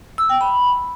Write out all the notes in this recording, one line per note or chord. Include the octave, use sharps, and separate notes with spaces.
E6
G5
B5